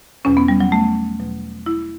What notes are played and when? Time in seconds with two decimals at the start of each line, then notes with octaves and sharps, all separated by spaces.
0.24 E2 B2 F#3 C#4
0.37 B3
0.48 G3
0.61 F#3
0.72 A3
1.20 E2 B2 F#3
1.66 E4